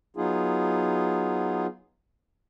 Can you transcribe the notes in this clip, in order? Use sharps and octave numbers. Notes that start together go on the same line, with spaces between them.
F#3 B3 D#4 F4 G#4